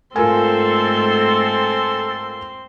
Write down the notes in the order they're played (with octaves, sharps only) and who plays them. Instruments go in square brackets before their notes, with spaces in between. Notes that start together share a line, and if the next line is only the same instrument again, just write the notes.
[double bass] G#2 A3 [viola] C4 C6 [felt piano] F4 A#4 G#5 [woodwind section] A4